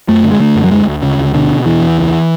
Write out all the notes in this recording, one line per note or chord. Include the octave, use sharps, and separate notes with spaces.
F#2 A3
D3
G#3
D3 A3
F#2
F#3
D2 G#3
D2
C#3
D2
B2 D3
B2
E2 E3
E2
C#2